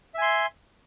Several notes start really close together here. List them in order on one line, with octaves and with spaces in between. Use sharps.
E5 G#5 C6